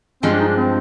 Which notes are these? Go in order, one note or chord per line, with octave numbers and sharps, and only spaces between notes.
G2 F3 G#3 C4
D4
D#4
D4
C4